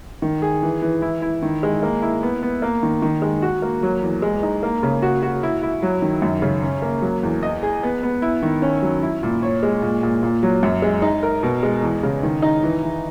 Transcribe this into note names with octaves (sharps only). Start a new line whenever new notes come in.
D#3
G#4
E3
E3
E4
E4
D#3
G#3
A#3
E4
B3
B3
A#3
D#3
D#3
G#3
F#4
A#3
F#3
E2
G#3
D#4
A#3
C#3
F#4
F#4
E4
E4
F#3
D#3
F#2
C#3
C#4
A#3
F#3
E2
D#5
G#4
B3
B3
E4
D#3
C#4
F#3
E4
A#2
C#5
G#3
A#2
A#2
A#2
F#3
F#2
G#3
D#4
A#4
B2
G#3
E2
C#3
D#3
D#4
E3
E3